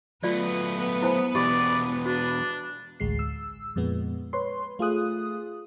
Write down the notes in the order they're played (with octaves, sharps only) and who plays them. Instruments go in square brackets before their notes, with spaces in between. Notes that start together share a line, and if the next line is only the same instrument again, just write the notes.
[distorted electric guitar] F#3 A3 [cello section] B3 B4 [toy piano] F4 D5
[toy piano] E4 C5 G#5
[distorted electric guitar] E2 B2 [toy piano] G4 [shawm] D5
[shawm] D4 [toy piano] F#4
[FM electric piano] A1 D2 G#3 C7
E6
F2 A#2 G#3 B3
B4 C#5 C6
A3 F4 G#4 D#6 F#6